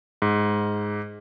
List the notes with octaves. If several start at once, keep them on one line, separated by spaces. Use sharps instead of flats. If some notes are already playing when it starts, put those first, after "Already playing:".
G#2